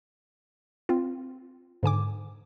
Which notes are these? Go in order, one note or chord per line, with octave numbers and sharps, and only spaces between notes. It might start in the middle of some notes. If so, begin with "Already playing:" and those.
C4 F4
G#2 D3 G#5 D6